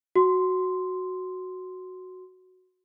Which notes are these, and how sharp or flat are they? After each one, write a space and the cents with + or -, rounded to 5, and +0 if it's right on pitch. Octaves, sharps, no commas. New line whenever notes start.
F#4 +0 C6 -5